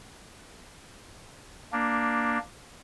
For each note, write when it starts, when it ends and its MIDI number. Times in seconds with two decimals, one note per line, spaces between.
1.72 2.38 58
1.72 2.38 62